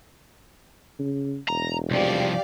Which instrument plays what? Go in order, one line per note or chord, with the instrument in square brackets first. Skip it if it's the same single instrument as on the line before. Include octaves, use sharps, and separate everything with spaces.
[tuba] C#3
[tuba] E1 [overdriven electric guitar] A#5
[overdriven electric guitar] C2 F3 [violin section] G4 D5 F5